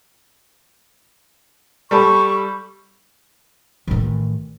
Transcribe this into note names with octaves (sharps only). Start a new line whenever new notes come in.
G3 A4 B5 C#6
A1 D#3